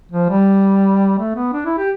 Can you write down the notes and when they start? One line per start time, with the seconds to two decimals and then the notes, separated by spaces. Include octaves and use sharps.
0.12 F3
0.29 G3
1.19 A3
1.36 B3
1.53 D4
1.66 E4
1.78 G4